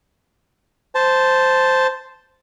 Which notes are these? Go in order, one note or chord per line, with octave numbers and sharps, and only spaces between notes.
C5 A5